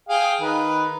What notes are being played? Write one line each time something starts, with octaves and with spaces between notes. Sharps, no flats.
G#4 F5 G5
D#3 B4